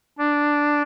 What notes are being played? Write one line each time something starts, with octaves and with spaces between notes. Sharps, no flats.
D4